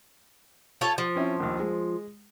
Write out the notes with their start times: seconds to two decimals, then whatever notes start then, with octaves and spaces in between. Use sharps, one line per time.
0.81 F4 A4 C#5
0.98 F3
1.15 C4 C#4 E4
1.40 A#1 D#2
1.60 G#3